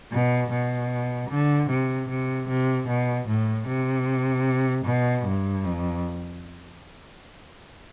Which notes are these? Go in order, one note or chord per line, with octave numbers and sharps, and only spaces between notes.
B2
B2
D3
C3
C3
C3
B2
A2
C3
B2
G2
F2